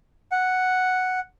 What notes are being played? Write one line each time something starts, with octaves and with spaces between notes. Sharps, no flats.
F#5